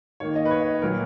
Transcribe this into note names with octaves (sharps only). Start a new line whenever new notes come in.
D#3 A#3 C#5
D#5
B4
C#5
D#5
A#2 F#3 A#3 A#4